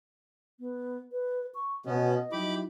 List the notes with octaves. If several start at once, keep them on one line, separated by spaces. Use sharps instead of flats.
B3
B4
C#6
B2 B3 C#4 D#5
F#3 D#4 E4 G4 B5 D6